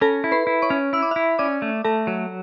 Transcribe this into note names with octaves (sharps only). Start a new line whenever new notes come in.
C#4 A4 A5
E4
B4 B5
E4
C#5 C#6
C#4
E4 E6
D6
E4 E5 E6
C#4 D5 D6
A3
A3 A4 A5
F#3